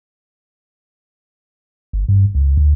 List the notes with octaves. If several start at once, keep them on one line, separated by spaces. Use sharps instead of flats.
G1
G2
C#2
D2